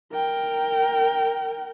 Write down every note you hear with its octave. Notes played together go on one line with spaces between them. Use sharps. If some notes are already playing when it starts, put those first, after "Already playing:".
A#4 G5